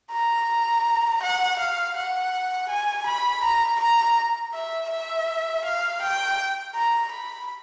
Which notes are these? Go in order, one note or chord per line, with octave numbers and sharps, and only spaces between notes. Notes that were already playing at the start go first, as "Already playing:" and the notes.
A#5
F#5
F5
F#5
G#5
B5
A#5
A#5
E5
E5
F5
G5
A#5
B5